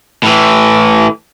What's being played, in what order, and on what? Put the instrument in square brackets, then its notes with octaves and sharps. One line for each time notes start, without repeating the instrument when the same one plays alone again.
[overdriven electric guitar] A2 E3